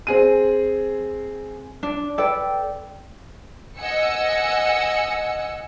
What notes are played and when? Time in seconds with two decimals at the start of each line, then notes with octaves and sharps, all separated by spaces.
0.07 C4 G#4 D#7
1.83 D4
2.18 A4 B4 D5 G5
3.80 D#5 F#5 G#5 E6 C#7